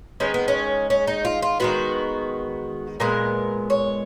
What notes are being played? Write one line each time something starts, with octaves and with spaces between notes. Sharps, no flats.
D#3 G#3 B3 C#4
B3
C#4
C#4
D#4
F4
F4
D#3 G#3 B3 F#4
A#2 G#3 B3 A#4
C#5